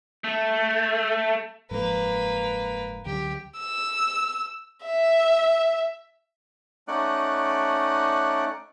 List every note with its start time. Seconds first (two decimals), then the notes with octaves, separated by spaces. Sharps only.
0.24 A3
1.71 F#1 G#2 F3 A#3 B4
3.06 C#2 D3 F#3 G4
3.59 E6
4.85 E5
6.88 A3 C#4 D#4 D5 F#5 F#6